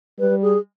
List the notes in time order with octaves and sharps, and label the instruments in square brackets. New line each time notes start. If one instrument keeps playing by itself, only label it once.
[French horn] G3 [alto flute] B4
[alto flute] G#4